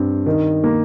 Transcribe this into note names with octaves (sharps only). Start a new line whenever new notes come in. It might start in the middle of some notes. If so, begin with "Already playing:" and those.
Already playing: G2 C4
D#3
A#3